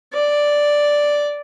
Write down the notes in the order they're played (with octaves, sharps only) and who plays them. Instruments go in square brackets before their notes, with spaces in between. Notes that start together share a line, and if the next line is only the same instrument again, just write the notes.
[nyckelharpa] D5